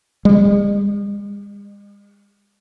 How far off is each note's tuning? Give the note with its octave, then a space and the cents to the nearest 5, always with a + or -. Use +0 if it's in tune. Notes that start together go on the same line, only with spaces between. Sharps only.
G#3 -45